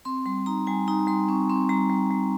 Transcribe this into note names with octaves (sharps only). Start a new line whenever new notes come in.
C4 C6
G3 C6
D#4 A#5
G3 G#5
D#4 A#5
G3 C6
C4 C#6
C4 C6
G3 A#5
G3
G3